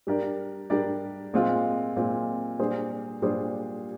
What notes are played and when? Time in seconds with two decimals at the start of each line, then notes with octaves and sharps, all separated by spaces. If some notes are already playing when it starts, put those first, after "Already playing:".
0.07 G3 D4 G4 A#4 D5
0.70 G3 D4 G4 A#4 D5
1.33 A#2 G#3 C4 F4
1.96 A#2 G#3 C4 F4
2.59 A#2 G3 D4 G#4 C5
3.22 A#2 G3 D4 G#4 C5